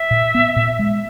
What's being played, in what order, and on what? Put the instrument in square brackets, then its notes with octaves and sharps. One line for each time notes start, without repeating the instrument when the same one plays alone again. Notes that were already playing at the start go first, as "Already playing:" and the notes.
Already playing: [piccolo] E5
[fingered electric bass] A#2
B3
A#2
G#3